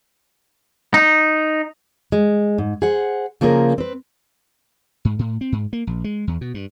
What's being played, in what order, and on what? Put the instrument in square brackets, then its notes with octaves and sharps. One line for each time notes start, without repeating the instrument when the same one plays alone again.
[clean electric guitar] D#4
[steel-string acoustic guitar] G#3
G#2
G#4 C5 F#5
C#3 F3 A#3 G#4 A#4
C4 B4
[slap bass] G#2
A2
C4
G#2
A#3
A#1
G#3
E2
B2
G2